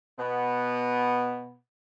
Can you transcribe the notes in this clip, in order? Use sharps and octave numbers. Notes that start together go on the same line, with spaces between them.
B2 B3